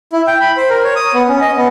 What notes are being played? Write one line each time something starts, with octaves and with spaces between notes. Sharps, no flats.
E4
G5
B5
C5
A#4
C#5
D#6
B3
C#4
D#5
B3